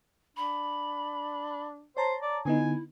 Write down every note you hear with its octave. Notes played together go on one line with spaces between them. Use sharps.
D4 B5
C5 C#5 A5 A#5
D5
D3 B3 D#4 E4 G#5